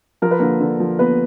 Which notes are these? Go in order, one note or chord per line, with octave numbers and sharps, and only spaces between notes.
F3 A#4
B4
D3 A#3 A#4
D3
F3
A#3 B3 B4